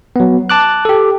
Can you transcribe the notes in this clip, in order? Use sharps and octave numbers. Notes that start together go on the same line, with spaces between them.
F#3 B3
A5 D6 F#6
G4 A4